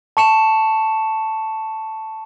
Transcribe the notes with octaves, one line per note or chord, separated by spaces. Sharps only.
A5 C#6 C#7 E7